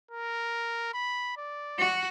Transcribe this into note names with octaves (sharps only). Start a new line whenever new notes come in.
A#4
B5
D5
F#4